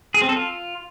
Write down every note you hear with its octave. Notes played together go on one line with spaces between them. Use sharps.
G#4
C4
A4
F4